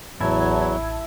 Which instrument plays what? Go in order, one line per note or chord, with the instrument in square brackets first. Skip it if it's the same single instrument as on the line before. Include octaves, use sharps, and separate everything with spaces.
[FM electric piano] A1 A5 G#6 [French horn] E2 [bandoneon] F#3 [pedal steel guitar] E4